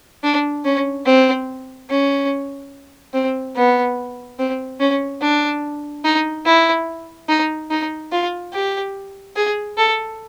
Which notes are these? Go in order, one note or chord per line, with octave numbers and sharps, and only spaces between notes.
D4
C#4
C4
C#4
C4
B3
C4
C#4
D4
D#4
E4
D#4
D#4
F4
G4
G#4
A4